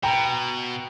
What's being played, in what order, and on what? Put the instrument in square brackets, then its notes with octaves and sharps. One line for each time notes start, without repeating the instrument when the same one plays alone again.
[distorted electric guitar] B2 [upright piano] G5 A#5